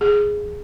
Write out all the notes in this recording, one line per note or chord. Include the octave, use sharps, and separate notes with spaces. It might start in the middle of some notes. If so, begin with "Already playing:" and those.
G#4